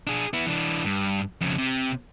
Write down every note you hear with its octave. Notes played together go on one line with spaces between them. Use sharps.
D4 G#4
B3 E4
E3 D4
G2
F2 C#3
C3